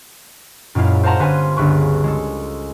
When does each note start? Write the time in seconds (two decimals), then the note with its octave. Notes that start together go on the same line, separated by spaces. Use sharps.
0.75 F#2 A#2 G#3 E4 F5
1.04 C5 F5 F#5 A5 A#5 C6
1.19 G1 B4 F5 G#5 C6
1.57 G1 C#2 B4 C#6
2.04 G#3 A4